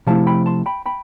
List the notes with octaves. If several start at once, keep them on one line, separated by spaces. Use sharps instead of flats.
C3 F3 A3 E4 F5 A5
G5 B5
A5 C6
G5 B5
G5 B5